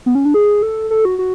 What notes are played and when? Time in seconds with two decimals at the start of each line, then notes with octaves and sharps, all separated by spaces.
0.06 B3
0.15 C#4
0.25 D4
0.34 G#4
0.63 A4
0.91 A4
1.05 F#4
1.19 F#4